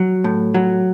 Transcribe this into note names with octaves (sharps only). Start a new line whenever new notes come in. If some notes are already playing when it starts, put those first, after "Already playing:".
Already playing: F#3
A2
F#3